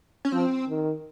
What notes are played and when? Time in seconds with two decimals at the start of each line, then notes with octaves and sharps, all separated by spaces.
0.25 C#4
0.32 F3 C4
0.69 D#3